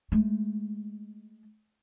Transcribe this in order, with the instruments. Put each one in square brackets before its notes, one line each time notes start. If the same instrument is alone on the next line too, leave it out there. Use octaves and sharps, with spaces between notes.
[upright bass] G#3 A3